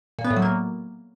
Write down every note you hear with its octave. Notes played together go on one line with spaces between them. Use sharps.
A#2
B3
A2
F#3
A#3